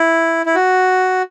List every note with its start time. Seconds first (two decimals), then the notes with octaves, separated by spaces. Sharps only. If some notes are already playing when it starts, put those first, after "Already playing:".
Already playing: E4
0.46 E4
0.55 F#4